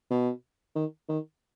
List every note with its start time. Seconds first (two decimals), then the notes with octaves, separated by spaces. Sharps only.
0.11 B2
0.75 D#3
1.09 D#3